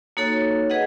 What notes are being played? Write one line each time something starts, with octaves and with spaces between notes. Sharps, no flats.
A#3 D#4 F#4 A4 C#5
G#4 B4 D#5 F#5